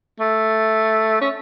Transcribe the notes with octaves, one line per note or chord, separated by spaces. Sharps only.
A3
C#4